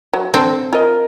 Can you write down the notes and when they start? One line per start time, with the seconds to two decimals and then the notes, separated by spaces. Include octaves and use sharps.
0.13 F#3
0.34 C4 D4 A4
0.73 F4 A#4 D#5